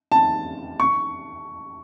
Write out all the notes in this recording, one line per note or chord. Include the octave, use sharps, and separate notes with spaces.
A5
C#6